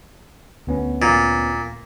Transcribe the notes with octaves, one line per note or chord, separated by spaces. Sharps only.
D2 B3 C#4
A#2